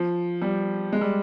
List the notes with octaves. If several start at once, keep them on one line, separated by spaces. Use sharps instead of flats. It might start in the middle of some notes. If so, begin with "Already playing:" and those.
Already playing: F3
G3
G#3
G3